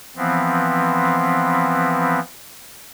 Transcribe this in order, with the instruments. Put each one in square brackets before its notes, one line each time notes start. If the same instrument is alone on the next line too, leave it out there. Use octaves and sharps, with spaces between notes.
[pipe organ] E3 F3 B3 C4